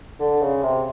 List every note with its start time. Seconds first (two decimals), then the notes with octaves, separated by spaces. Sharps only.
0.20 D3
0.41 C#3
0.63 C3